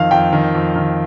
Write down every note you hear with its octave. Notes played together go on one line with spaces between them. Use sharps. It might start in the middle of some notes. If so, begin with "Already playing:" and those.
Already playing: F2 D#3 F5
F2 G5
D#3
F2
D#3